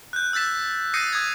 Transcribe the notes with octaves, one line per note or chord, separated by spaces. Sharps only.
F#6 G6
E6 G6 A6 B6 E7
D#6 G6 A#6 C7 C#7 D#7
D#6 G#6